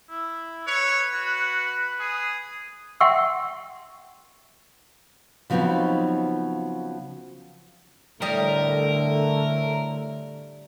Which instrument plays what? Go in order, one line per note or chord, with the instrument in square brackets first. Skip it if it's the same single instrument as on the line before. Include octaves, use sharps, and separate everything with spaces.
[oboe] E4
[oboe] B4 [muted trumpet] C#5
[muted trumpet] F#4
G#4
[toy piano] E5 F#5 G5 C6 C#6 E6
[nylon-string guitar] C#3 F3 F#3 B3 C4 D#4
[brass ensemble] A2 A3 [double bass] D3 [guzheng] G3 D#5 [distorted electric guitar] A#4